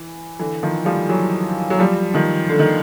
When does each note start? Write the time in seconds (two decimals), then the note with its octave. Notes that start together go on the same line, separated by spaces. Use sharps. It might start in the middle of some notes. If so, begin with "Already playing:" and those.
Already playing: E3
0.39 D3 E3
0.63 D#3 F3
0.85 F3 G3
1.09 E3 F#3
1.70 F#3
1.79 F3 G3
2.14 D#3 F3
2.49 D3
2.59 D#3